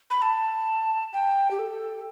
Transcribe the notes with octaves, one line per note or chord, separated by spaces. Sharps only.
B5
A5
G5
G4
A4